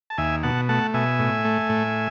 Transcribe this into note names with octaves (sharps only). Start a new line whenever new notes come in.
A5
D#2 E5 G#5
B2 F#5 A5
A3 F#5 A5
B2 E5 G#5
A2
A3
A2